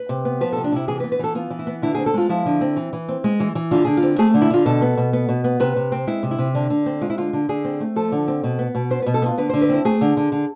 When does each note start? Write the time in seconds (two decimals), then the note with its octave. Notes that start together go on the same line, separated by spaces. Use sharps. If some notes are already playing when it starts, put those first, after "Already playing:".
Already playing: B4
0.09 C3
0.25 B3
0.41 F3 B4
0.53 A4
0.57 C3
0.64 D4
0.72 C3 E4
0.88 E3 G#4
1.00 B4
1.04 B3
1.12 B4
1.19 E3 A4
1.35 B3 F4
1.50 E3
1.59 E4
1.67 B3
1.82 D3 E4
1.94 G#4
1.98 C4
2.06 A4
2.14 G#3 F4
2.29 F3 E4
2.46 D3
2.61 C4
2.76 E3
2.93 E3
3.09 C4
3.24 G#3
3.40 E3
3.55 E3
3.71 D3 F4
3.84 D3 G#4
3.97 F4
4.03 C4
4.19 A3 G#4
4.34 D3
4.42 E4
4.50 D3 F4
4.66 B2 A4
4.82 B3
4.97 B2
5.13 B3
5.29 B2
5.44 B3
5.60 C3 B4
5.76 C3
5.92 C4
6.07 G#3 E4
6.23 C3
6.31 E4
6.39 C3
6.55 D3 D4
6.70 D3
6.86 C4
7.01 G#3 F4
7.10 E4
7.18 D3 F4
7.33 D3
7.49 D3 G#4
7.65 C4
7.80 A3
7.96 F3 A4
8.12 D3
8.28 C4
8.43 B2
8.59 B3
8.75 B2
8.90 B3 C5
9.02 B4
9.06 B2
9.14 A4
9.22 B3 F4
9.38 D3 B4
9.50 C5
9.53 D3
9.61 B4
9.69 C4 E4
9.85 A3 G#4
10.01 D3
10.17 D3
10.32 D3